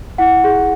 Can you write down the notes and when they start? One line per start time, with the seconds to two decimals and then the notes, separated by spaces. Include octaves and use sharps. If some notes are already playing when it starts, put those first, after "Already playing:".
0.18 E4 F#5
0.44 G#4